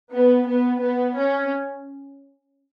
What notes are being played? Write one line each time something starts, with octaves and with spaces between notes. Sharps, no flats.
B3
B3
B3
C#4